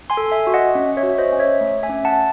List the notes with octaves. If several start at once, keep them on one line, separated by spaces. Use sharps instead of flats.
G#5 C6
A4
E5 G#5
F#4
D#5 F#5
C#4
C#5 E5
F#4
C5 D#5
C#4
C#5 E5
A3
E5 G#5
C#4
F#5 A5